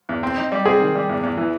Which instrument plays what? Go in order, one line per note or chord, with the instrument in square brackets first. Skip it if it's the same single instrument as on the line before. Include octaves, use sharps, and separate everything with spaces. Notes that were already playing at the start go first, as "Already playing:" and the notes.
[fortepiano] E2
C4
D#4
G3
[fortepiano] C4 [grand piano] G#4
[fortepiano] D#3
G3
E2
E2
E3